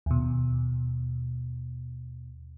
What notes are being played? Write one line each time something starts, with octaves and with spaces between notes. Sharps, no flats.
D#2 B2